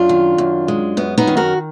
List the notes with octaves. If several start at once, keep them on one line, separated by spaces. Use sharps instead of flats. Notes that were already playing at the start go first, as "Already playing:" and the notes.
Already playing: F#2 D4 F4
D#3
F#2
G#3
F#2 B3
B3 D#4
D#3
F#4 A#4